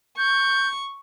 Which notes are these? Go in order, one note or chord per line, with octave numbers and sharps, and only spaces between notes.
C#6 G6